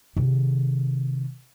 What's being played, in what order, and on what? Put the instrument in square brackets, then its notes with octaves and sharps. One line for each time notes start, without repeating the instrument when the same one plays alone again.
[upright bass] C3 D#3